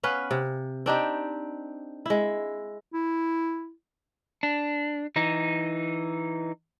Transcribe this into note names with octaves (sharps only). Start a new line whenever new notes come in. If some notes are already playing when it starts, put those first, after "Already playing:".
B3 C#4 B4 F5
C3
C4 D4 D#4 G4
G#3 E4
E4
D4
E3 D#4